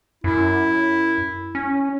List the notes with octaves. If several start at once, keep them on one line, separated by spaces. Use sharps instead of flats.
F#2 E4
C#4